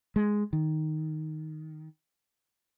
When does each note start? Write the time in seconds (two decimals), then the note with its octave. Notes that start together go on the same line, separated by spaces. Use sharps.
0.16 G#3
0.53 D#3